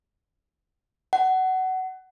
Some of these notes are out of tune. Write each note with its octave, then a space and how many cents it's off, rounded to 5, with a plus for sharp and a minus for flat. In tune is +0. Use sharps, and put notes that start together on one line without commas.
F#5 +20